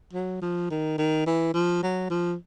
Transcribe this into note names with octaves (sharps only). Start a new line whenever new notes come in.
F#3
F3
D#3
D#3
E3
F3
F#3
F3